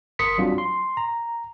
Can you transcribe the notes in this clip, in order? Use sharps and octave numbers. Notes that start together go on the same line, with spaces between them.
G1 A#4 C6 D#6 B6 C#7
F#3 G3 C4 D4 F4 F#4
C6
A#5